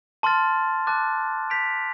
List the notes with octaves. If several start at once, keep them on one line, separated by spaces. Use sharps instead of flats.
A5 C6 F6 A6
A5 D6 F#6 A6
G6 B6 D7 F7